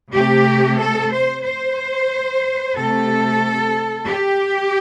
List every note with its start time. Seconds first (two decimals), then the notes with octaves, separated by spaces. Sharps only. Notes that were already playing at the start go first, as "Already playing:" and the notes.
0.14 C3 A3 G4
0.80 A4
1.12 C5
1.44 C5
2.75 C3 A3 A4
4.07 G4